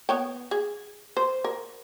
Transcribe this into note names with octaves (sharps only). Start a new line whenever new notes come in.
B3 C#5 G5
G#4
C5
A#4